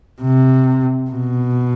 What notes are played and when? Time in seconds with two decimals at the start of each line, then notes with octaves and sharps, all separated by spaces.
0.22 C3
1.09 B2